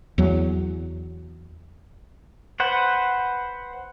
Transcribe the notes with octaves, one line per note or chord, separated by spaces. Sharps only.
E2 F#3
B4 C5 F#5